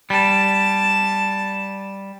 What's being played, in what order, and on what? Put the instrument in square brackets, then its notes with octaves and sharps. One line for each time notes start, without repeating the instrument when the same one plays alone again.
[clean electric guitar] G3 [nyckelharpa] A5